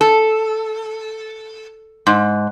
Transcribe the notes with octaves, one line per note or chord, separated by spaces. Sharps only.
A4
G#2